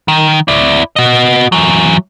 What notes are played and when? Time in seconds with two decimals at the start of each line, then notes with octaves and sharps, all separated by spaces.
0.08 D#3
0.48 E4 D5
0.96 F#4 D#5
1.52 E3 F#3